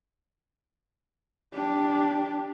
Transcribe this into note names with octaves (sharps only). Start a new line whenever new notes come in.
D4 G4